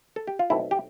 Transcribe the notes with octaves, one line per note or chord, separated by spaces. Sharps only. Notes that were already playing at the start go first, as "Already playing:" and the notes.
A4
G4
F4
B1 B2 A3 C4 E4
G4